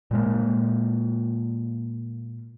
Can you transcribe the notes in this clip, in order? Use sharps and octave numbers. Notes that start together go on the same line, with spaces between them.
A#2 G#3 A#3